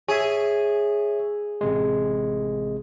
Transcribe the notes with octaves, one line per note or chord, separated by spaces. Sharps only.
G#4 C#5 E5
A1 C3 G#3